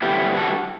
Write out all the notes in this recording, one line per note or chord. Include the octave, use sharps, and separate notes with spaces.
D3 G3 B3 E4 G4
F#4 A4